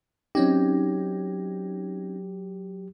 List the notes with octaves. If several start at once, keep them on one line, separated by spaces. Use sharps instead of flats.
F#3 C4 C#4 D#4 G4